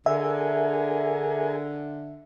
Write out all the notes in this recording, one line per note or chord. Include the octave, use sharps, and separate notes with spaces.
D3 G#4 A#4 E5 G#5